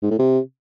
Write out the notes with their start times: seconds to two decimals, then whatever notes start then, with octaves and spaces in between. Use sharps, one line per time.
0.02 G#2
0.11 A2
0.19 C3